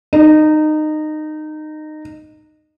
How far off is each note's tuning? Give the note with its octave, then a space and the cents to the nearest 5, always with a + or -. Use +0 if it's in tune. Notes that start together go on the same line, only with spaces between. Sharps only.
D#4 -20